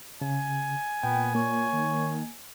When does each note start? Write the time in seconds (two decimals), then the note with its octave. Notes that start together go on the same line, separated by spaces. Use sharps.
0.21 C#3 G#5
1.03 A#2 B3 G5
1.35 A#3 C#5
1.73 D#3